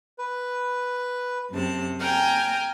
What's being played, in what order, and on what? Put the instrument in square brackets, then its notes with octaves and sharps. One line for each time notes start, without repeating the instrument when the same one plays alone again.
[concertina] B4
[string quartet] F#2 C3 A5
[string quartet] G5 G#5 A#5 [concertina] F6